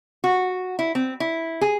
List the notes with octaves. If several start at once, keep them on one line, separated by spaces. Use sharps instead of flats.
F#4
E4
C4
E4
G#4